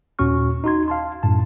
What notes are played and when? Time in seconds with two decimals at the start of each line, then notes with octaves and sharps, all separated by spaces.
0.19 D#2 A#2 C#4 F#4 C#6 F6
0.64 D#4 F#4 C6 G#6
0.88 F5 A5 C6
1.23 F#2 A2 A5